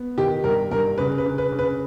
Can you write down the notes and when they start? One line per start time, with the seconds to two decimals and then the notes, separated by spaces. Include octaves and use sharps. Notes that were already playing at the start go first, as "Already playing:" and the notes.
Already playing: B3
0.18 D#3 G4
0.44 G2 A#4
0.71 G2 A#4
0.98 C#3 B4
1.18 B4
1.26 C#3
1.38 B4
1.52 C#3
1.59 B4